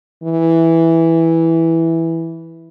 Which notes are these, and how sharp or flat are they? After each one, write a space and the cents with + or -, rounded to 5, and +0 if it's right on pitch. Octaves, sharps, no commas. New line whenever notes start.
E3 -5